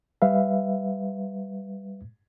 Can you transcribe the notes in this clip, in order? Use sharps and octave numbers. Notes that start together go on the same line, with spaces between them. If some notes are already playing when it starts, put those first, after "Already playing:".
G3 B4 E5 F5